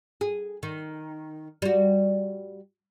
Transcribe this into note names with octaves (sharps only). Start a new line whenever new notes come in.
G#4
D#3
G3 F#4